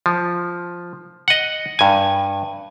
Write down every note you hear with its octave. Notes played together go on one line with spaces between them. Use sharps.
F3
D#5 F#5
G2 G#5